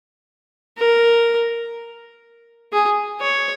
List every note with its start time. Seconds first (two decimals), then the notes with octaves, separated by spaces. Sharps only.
0.78 A#4
2.73 G#4
3.21 C#5